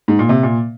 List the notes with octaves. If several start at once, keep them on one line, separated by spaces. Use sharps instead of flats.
G#2
A#2
C3
A#2